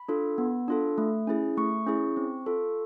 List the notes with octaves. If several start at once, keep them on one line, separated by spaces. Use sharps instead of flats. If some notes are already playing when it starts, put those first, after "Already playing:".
Already playing: B5
D4 F4 A4
B3
D4 F4 A4
A3
C#4 E4 G#4
A3 C#6
C#4 E4 G#4
C4
F4 A4